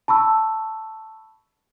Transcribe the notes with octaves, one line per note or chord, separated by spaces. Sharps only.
A5 B5 C#6 E6